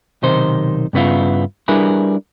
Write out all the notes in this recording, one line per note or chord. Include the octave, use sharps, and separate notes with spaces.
B1 C3 D#3 D#4 C5
G2 C#3 B3 E4 F4
G3 D4 E4 G#4 A#4 B4